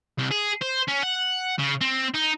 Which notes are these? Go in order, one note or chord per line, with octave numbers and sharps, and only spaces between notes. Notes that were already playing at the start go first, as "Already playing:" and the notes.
C2
G#4
C5
C#4
F#5
C#3
C4
D#4